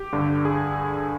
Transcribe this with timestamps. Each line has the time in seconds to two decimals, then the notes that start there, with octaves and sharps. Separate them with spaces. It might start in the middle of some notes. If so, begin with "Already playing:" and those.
Already playing: G4
0.13 G2 D3
0.45 G#4